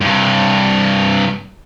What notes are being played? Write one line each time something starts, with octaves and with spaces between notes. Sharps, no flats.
G2 C3